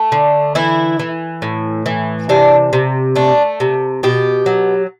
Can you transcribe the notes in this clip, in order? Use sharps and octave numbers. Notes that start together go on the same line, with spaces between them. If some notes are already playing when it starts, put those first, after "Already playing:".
Already playing: A3
D3
E3 E4
E3
A2
E3
C3 D4
C3
A3 D4
C3
B2 G4
F#3